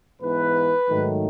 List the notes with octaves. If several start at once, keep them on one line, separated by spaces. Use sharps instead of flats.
G#2 E3 B3 B4
G#2 D#3 F#3 A3